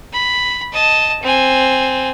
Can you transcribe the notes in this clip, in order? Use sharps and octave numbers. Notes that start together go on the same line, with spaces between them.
B5
D#5 A5
C4 G#5